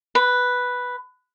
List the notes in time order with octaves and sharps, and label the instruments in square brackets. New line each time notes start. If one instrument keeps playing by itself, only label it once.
[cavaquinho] B4